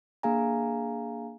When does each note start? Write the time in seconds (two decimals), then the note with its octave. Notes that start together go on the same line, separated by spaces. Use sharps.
0.23 A#3 D4 G#4 F5 G#5 A#5